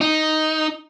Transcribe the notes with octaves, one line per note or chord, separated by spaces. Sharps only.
D#4